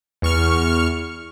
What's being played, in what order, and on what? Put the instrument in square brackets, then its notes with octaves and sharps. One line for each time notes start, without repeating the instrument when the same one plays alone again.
[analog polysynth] E2 C#6 F6